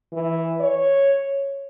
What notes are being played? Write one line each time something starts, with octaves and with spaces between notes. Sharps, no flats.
E3
C#5